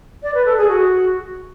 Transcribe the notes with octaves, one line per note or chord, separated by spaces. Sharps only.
D5
B4
A4
G#4
F#4